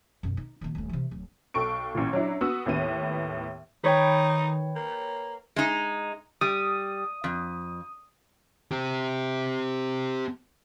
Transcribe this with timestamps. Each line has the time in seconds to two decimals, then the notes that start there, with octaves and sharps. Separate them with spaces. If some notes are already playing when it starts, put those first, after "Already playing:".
0.23 F#2 B2
0.37 D#4
0.61 A#2 D#3
0.75 D#1 A3
0.89 C3 E3
1.11 D1
1.54 B1 A4 G5 C#6 D7
1.95 A1 A#2
2.13 F#3 D4 E4
2.41 B3 F#4 D#6 E6
2.66 D#2 A2 B3 D#7
3.84 D#3 D#4 B4 C#5 G5
4.75 A#3
5.56 G#3 D#4
6.41 G3 D#6
7.24 F2
8.71 C4 G4